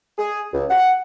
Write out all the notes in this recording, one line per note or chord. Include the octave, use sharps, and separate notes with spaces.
G#4
C#2
F#5